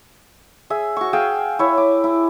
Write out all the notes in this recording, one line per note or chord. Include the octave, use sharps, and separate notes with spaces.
G#4 E5
F#4 C#6
G#4 F5 G5 E6
E4 C#5 E5
D6
E4